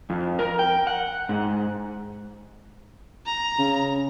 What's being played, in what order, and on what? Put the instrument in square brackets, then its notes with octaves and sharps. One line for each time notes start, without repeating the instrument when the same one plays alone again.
[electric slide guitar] F2
A#4
G5
F#5
G#2
[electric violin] A#5
[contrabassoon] C#3